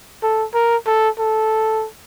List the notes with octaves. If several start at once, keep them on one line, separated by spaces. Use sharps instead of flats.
A4
A#4
A4
A4